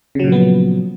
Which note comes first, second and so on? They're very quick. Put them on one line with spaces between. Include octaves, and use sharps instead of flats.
C#3 F#3 A#2 F3 B3